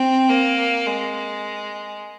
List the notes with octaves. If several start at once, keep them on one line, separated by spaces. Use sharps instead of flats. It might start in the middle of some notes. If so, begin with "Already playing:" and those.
Already playing: C4
A#3
G#3